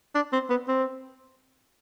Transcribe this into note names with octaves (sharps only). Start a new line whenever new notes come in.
D4
C4
B3
C4